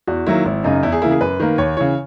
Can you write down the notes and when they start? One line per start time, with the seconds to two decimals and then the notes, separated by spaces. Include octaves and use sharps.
0.07 E2 F#4
0.26 D#3 F#3 A#3 E4
0.45 G#1 E4
0.64 F#2 C#3 D#4
0.83 E2 E4
0.92 G#4
1.02 C#3 E3 A#3 E4
1.11 G#4
1.21 F#2 B4
1.40 D#3 A#3
1.58 D#2 C#5
1.77 C#3 E3 C#5